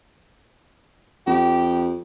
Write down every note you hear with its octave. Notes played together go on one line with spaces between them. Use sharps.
F2 G4